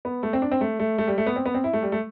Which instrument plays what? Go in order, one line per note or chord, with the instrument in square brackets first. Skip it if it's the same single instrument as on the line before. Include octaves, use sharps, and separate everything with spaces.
[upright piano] B3
A3
C4
D4
C4
A3
A3
A3
G3
A3
B3
C4
B3
C4
E4
A3
G3
A3